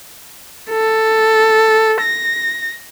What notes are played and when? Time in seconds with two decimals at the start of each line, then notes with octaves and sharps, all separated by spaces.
0.70 A4
2.02 A#6